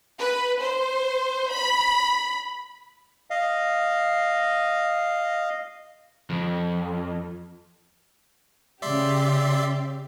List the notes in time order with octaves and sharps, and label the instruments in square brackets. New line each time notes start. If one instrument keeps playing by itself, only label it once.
[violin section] B4
C5
B5
[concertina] D#5 F5
[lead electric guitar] F2
[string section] C#3 G4 [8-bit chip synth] D5 E5 C6